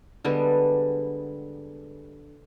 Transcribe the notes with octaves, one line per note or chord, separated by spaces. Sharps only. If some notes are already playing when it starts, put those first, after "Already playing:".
D3 G3 G#3 B3